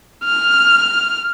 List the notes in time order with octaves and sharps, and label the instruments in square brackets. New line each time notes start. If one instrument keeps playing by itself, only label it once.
[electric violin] F6